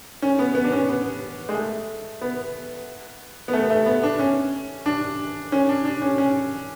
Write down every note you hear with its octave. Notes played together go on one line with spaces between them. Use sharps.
C#4
B3
B3
D4
C#4
B3
G#3
A3
B3
B3
A3
A3
B3
D4
C#4
D4
C#4
D4
D4
C#4
C#4